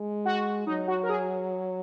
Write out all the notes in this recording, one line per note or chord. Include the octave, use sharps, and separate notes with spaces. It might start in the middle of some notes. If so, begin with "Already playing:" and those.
Already playing: G#3
F#4
F#3 D#4
F#4
A#4
G#4